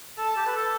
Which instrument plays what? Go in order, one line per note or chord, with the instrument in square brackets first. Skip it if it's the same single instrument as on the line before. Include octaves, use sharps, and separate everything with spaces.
[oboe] A4 [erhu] A5
[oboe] G4
B4
A4